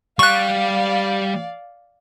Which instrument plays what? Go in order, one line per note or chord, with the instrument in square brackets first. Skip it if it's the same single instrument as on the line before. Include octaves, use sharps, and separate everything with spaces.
[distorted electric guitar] G3 [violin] D5 F5 [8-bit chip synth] C#6 F#6